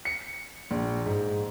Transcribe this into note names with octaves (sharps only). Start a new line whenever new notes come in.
C#7
A#1
G#2